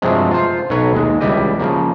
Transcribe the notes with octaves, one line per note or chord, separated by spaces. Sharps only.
G2 C3 F3 F#3 G#3
F4 C5
B1 F#3 B4 C#5
D#2 G#3
C#2 E3 G3 E4 G4 D#5
C#3 F3 A#3